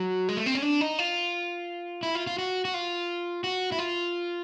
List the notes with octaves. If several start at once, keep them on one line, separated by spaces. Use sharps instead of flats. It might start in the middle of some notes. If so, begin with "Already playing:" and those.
Already playing: F#3
G#3
A3
C4
C#4
D4
D#4
F4
E4
F4
F4
F#4
F#4
F4
F#4
E4
F4